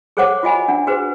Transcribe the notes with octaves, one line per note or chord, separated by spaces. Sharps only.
G#4 A4 C5 C#5 F#5 D6
F4 F#4 D#5 G#5 B5
D4 F#5
F#4 G#4 B4 C5